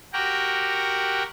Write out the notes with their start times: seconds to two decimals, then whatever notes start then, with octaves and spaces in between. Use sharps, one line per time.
0.13 F#4 G4 A#4 F#5 G5 A#5